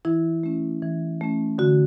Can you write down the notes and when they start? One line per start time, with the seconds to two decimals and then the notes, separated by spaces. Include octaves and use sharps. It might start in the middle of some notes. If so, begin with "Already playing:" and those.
0.05 E3 E4
0.44 A3 C#4
0.82 E3
1.21 A3 C#4
1.58 D3 F#4